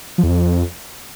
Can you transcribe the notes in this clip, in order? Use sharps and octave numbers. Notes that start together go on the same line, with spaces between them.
F3
E2
F2